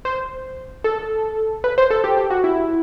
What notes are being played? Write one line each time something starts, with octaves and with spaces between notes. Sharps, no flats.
C5
A4
B4
C5
A4
G4
G4
F#4
E4